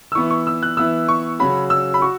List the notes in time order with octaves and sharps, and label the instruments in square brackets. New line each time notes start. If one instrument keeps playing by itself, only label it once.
[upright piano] E6
[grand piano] E3 B3 E4 [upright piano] C#6
[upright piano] C#6
E6
F#6
[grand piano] E3 B3 E4 [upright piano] E6
[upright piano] C#6
[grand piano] C#3 F#3 C#4 F#4 [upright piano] B5
[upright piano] E6
B5
[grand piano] F#4 [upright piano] C#6